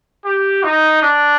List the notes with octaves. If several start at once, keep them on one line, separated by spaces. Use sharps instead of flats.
G4
D#4
D4